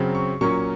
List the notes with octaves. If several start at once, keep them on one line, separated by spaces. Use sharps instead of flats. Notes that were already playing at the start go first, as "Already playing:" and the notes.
Already playing: F#2 C#3 F#3 C4
C#6
A#2 F#3 A#3 C#4 C#6